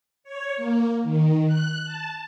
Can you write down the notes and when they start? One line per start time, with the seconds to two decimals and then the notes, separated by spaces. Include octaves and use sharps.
0.24 C#5
0.57 A#3
1.03 D#3
1.47 F#6
1.86 A5